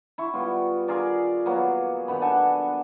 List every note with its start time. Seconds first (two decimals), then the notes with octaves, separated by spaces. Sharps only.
0.18 E4 C#6
0.33 G3 B3 F4 G5
0.88 F4 G#4 A#4 D5
1.46 F#3 A#3 B3
2.08 D#3 B3 B5
2.21 D4 A4 F#5 G#5